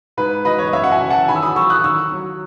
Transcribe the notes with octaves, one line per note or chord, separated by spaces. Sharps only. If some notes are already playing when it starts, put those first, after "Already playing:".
G#2 B4
E3 B4 D#5
C#5
D#5
F#2 C#5 E5
F#5
E5 G#5
E3
F#5 A5
D#3 G#5 B5
E6
B5 D#6
F#3 C#6 E6
D#6 F#6
D#3 C#6 E6
F#3